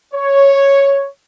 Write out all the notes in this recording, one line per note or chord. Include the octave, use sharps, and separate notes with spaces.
C#5